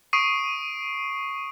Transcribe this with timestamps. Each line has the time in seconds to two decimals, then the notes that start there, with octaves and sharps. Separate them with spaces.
0.13 C#6 D#6 C7 D7 D#7